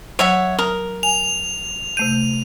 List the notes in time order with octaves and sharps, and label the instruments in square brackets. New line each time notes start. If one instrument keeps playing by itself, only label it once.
[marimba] F#3 [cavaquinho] C#5 E5 F#5
[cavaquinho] A#4 [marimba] D#6
[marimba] G#5 [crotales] F7
[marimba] C3 A3 G6 [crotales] D#7